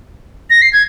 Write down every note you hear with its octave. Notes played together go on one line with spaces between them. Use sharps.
A#6
C7
G#6